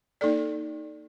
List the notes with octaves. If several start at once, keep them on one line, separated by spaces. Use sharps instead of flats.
A#3 D#4 A4 D5